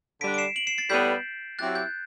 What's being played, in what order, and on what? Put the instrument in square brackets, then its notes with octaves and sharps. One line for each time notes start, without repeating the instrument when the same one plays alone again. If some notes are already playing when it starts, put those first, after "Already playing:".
[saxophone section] D3 G3 D4 [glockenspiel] B6 D7
[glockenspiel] D7
C7 E7
D7 F#7
C7 E7
A6 C7
[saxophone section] A2 G3 B3 [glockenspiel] G6 B6
[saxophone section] F#3 C4 E4 G4 [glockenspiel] F#6 A6
[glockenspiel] G6